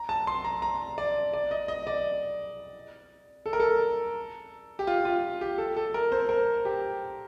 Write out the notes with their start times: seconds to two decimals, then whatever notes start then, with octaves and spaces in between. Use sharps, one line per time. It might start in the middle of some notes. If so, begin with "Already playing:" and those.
Already playing: A#5
0.09 A5
0.27 C6
0.45 A#5
0.62 A#5
0.98 D5
1.33 D5
1.51 D#5
1.68 D#5
1.87 D5
3.46 A4
3.53 A#4
3.60 A4
4.79 G4
4.87 F4
5.05 F4
5.41 G4
5.58 A4
5.76 A4
5.94 A#4
6.12 C5
6.29 A#4
6.65 G4